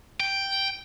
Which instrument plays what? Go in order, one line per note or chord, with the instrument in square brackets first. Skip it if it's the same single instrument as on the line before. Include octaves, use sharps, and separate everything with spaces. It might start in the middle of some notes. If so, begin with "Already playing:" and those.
[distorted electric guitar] G5